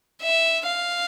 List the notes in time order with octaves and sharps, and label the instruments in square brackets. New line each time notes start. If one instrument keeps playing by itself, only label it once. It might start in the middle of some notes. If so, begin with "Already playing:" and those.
[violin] E5
F5